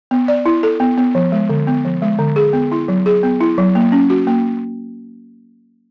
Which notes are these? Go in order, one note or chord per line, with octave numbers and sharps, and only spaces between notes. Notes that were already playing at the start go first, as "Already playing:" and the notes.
B3
D5
E4
A4
B3
B3
F3
G#3
D3
B3
F3
G#3
D3
G#4
B3
E4
F#3
G#4
B3
E4
F#3
A#3
C#4
F#4
A#3